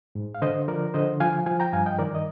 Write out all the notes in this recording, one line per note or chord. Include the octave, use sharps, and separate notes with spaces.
G#2
F5
D3 C5 D#5
F3 A#4 D5
D3 C5 D#5
F3 F5 G#5
F3 F5 G#5
G5 A#5
G2 F5 G#5
D#5 G5
D#3 A#4 D5
D#5